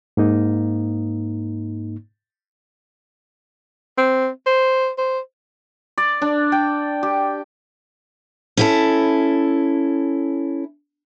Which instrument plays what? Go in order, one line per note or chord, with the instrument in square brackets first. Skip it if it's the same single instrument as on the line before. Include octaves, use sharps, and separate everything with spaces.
[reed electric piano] G#2 A#3 D#4
[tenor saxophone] C4
C5
C5
[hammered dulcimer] D5
D4
G5
G4
[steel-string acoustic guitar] C#4 E4 A4